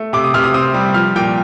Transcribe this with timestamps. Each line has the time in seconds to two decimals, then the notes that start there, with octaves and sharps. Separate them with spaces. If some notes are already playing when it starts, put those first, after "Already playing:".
Already playing: A3
0.13 C3 D6
0.24 D#6
0.34 C3 F6
0.44 D#6
0.54 C4 D#6
0.74 G3
0.94 F3 F6
1.16 A#2 G5